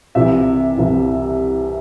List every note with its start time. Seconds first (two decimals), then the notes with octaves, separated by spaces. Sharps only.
0.15 C2 C3 E3 E5
0.77 C2 C3 E3